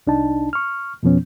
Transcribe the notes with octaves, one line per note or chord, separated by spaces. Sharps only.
C2 D4 D#4 A5
C#6 F6
F2 B2 F3 B3 C#4